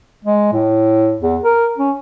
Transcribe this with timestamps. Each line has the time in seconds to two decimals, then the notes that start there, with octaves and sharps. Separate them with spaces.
0.25 G#3
0.53 A2
1.21 E2
1.43 A#4
1.78 C#4